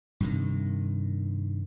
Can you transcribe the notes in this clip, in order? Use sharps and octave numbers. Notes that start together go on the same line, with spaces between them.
G2 C3 D#3